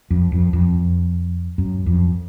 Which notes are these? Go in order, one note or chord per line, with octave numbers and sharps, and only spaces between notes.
F2
F2
F2
F#2
F2